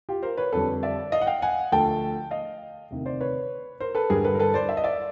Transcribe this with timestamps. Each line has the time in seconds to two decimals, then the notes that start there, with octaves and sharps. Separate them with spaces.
0.09 F4 G4
0.22 A#4 C5
0.38 B4 C#5
0.52 F2 D3 G3 A4 B4
0.83 D5 E5
1.12 D#5 F5
1.21 F#5
1.27 F5 G5
1.42 F#5 G#5
1.72 D2 D3 F3 A3 G5 A5
2.31 D#5 F5
2.90 D2 C3 D#3
3.06 C5 D5
3.21 B4 C#5
3.80 A#4 C5
3.95 A4 B4
4.10 G2 D3 G3 G#4 A#4
4.25 A4 B4
4.35 A#4
4.39 A4 B4
4.54 C5 D5
4.69 E5
4.77 D#5
4.84 D5 E5